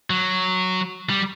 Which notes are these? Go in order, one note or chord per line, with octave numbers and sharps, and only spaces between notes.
F#3
G3